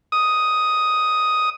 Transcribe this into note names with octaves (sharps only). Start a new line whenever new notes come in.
D#6